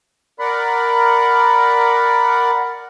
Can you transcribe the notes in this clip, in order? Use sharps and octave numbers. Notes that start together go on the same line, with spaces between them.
A#4 D5 F#5 B5